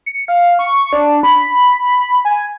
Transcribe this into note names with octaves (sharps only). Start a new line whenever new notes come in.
C#7
F5
C#6
D4
B5
G#5